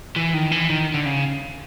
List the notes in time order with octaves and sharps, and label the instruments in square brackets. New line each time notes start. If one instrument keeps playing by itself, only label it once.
[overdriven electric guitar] E3
D#3
E3
D#3
D3
C#3